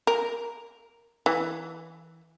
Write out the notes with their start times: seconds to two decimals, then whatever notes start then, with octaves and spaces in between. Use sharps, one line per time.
0.07 A#4
1.26 E3